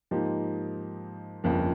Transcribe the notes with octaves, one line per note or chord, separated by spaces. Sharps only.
G#2 F3 A#3 D#4 G4
G1 F2 C#3 F3 A#3